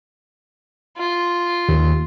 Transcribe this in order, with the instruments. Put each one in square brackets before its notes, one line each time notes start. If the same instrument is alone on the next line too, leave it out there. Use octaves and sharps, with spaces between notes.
[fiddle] F4
[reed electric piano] D#2